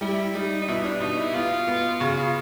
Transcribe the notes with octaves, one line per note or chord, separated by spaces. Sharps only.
G3 E4
G3 D#4
D#4
B2 E4
D4
B2 D#4
E4
B3 F4
B3
C#3 F#4
F4